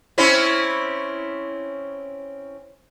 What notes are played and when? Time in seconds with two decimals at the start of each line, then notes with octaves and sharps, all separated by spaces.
0.18 C4 C#4 E4